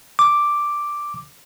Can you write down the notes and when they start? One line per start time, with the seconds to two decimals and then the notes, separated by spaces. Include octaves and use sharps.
0.19 D6